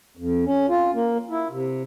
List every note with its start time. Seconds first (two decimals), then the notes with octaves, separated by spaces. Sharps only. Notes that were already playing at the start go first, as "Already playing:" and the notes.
0.17 F2
0.46 C#4
0.69 F4
0.95 A#3
1.31 E4
1.50 C3